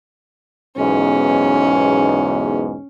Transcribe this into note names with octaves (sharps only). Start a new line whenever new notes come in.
B1 E2 G#2 C#4